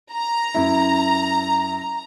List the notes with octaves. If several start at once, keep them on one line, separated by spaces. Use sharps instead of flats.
A#5
F#2 E4